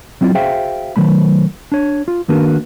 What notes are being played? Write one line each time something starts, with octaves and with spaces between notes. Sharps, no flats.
F#3 C4 E4 F4 D5
F#4 G#4 C5 E5 F5 G5
D#3 F#3 A3 B5
D4 C#5
F4
D#3 A#3 D4 F#4 A#4 B4